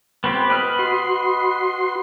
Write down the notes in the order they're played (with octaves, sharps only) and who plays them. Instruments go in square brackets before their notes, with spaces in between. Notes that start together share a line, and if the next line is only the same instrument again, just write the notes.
[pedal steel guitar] B3 C4 G4
B4 D#5 F6
[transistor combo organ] F#4 C6